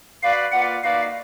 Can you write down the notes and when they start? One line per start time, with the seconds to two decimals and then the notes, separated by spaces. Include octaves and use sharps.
0.23 F#4 B4 D5 F5
0.52 A#3 F4 B4 D5 F#5
0.83 A#3 D#4 F#4 B4 D5 F5